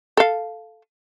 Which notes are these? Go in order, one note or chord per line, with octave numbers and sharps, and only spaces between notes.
A4 F5